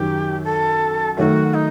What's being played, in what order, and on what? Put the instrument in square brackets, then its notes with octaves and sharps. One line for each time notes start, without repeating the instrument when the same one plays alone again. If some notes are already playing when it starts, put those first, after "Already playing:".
Already playing: [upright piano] F#2 D#3 F#3 [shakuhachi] G4
[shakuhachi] A4
[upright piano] D#3 F#3 A3 [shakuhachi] F#4
[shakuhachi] D#4